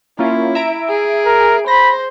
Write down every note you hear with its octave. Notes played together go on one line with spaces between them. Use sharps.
A#3 C#4 E4 F4
E5 A#5 D7
G#4
A#4
C5 B5 A#6